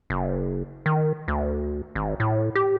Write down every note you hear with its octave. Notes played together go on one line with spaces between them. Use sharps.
F#1
D#3
D2
G#1
A2
G4